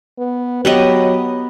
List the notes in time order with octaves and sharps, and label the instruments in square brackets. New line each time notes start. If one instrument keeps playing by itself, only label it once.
[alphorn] B3
[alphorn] F#3 [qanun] B3 G4 D#5